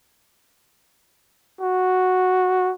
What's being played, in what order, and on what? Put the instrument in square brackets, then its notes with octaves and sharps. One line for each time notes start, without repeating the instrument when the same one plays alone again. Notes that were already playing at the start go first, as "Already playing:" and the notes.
[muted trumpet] F#4